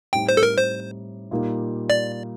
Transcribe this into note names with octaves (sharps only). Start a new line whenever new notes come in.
A2 G3 C4 D#4 G5
C5
A4
A#4
C5
A#2 G3 A#3 D#4
D5